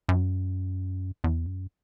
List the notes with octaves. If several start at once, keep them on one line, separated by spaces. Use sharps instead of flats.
F#2
E2
F#2